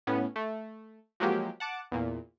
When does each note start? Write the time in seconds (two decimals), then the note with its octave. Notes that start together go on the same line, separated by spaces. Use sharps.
0.07 A2 B3 C#4
0.36 A3
1.20 F3 F#3 G#3 A#3 G4
1.60 F#5 A5 D6
1.92 E2 A#2